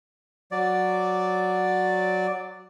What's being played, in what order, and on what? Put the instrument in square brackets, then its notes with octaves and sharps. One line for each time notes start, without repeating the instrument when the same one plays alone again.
[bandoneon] F#3 D5